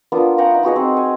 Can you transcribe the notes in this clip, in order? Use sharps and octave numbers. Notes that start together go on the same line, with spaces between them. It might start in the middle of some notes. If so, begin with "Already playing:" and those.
A#3 B3 D4 F4
F#5 G5 A#5 C#6
D#4 E5
B3 F#4 G#4 D#5
C4
G#5